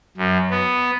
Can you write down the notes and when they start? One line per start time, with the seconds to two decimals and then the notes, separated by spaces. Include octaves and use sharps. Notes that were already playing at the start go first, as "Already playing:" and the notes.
0.17 F#2
0.51 B3